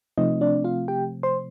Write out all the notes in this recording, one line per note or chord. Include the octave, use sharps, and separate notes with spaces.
C3 F3 A3 C4 D#4 D#5
D4 D5
F4 F5
G4 G5
C5 C6